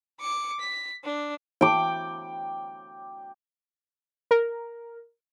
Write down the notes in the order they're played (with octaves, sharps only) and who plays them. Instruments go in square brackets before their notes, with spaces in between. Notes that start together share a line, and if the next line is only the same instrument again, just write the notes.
[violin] D6 C#7
B6
D4
[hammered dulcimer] G5 D6
[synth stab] A#4